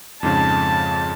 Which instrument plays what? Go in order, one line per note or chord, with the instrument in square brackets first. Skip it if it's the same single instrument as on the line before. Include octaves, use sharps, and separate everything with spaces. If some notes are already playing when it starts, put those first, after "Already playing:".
[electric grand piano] F2 G#2 C#3 [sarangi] A5